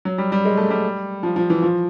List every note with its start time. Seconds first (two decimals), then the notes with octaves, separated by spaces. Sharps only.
0.05 F#3
0.18 G3
0.32 G3
0.45 G#3
0.57 A3
0.70 G3
1.23 F3
1.36 F3
1.50 E3
1.62 F3